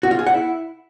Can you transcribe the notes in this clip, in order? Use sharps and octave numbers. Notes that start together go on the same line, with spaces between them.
F#4
F4
G#4
F#5
E4